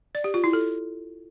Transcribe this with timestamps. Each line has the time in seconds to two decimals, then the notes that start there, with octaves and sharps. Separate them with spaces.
0.15 D5
0.24 G4
0.34 F4
0.44 E4
0.53 A4